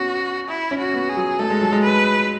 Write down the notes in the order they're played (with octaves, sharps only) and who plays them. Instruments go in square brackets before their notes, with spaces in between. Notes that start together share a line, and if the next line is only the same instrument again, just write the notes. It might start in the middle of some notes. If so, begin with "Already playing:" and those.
Already playing: [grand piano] B3 C#4 [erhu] F#4
[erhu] E4
[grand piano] C#4
[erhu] F#4
[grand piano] B3
[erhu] G#4
[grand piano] F#3
[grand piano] A3 [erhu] A4
[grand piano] G#3
F#3
G#3
[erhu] B4